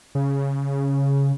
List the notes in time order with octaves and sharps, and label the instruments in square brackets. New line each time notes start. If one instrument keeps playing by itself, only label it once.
[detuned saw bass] C#3